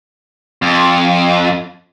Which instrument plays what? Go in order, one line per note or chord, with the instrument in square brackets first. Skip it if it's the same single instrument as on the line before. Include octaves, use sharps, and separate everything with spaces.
[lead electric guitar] F2